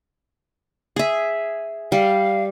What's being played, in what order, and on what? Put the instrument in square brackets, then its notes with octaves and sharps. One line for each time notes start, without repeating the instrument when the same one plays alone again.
[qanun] G#4 E5
[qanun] G3 [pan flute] F5